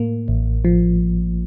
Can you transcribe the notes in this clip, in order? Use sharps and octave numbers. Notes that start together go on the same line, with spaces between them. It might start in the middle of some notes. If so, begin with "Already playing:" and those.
Already playing: A2 A#3
A1
F3